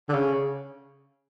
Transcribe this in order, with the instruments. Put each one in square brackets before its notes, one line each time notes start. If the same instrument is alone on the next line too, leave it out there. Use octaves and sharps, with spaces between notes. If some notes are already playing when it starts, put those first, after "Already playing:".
[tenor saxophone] D3
C#3